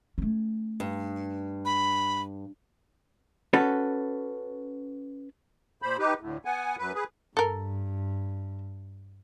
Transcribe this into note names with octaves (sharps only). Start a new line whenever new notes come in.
A3 C#4
G2
B5
C#4 F#4 A4 B4
A#2 C5 B5
D#4 G4 B4
D2 A2
B3 F#5 G#5
F#2 B4
G#4 B4
G2 A4 A#4